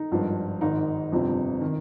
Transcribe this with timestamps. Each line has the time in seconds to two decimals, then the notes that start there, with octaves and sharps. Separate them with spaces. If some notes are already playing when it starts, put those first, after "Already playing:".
Already playing: D#4
0.11 G#1 G2 F3
0.61 G#1 G#2 D#3 D#4
1.12 G1 F2 C3 F3
1.61 D#3